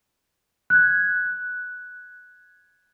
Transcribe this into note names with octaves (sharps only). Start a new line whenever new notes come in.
F#6 G#6